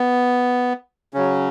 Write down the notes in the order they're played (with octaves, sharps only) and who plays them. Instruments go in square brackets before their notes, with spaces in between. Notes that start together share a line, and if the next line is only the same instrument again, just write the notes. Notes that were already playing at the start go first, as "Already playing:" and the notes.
Already playing: [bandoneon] B3
C#3 F#3 C#4